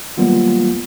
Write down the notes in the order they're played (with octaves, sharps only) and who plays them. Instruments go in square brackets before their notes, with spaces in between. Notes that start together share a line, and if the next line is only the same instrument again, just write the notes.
[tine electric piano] D#3 F#3 G3 A#3 B3 F4